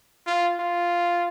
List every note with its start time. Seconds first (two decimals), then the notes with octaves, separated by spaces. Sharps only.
0.27 F4
0.59 F4